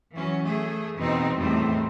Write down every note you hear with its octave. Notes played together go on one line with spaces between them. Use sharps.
E3 F#3 C#4
A3 G#4
E2 B2 C4 D#4
E2 A2 D#3 G3 A3 C4